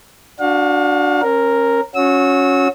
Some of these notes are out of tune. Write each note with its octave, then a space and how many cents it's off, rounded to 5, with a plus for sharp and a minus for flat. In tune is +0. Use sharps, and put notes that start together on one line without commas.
D4 +0 F#4 +0 F5 +35
C#4 -35 A#4 +0
C#4 +0 F#4 -20 E6 -30